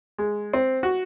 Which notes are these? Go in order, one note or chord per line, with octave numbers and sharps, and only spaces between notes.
G#3
C4
F#4